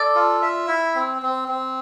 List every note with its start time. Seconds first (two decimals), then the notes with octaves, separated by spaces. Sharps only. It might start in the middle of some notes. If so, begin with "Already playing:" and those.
Already playing: A4 D5
0.15 F4
0.42 E5
0.68 E4
0.95 C4
1.22 C4
1.48 C4